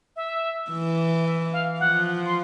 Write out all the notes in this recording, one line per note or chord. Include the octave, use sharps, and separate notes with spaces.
E5
E3
E5
F5
F3 F#5
C6